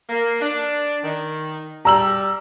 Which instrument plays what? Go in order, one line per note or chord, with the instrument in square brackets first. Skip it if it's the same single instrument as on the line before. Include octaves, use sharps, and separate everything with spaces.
[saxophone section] A#3
D4
D#3
[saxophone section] G3 [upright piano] A#5 E6 F#7